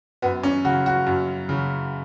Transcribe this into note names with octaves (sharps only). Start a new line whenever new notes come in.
F#2 B3
C#4
C#3 F#4
F#4
F#2
C#3